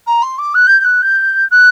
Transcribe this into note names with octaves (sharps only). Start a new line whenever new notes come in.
A#5
C6
D6
F#6
G6
G6
F#6
G6
F#6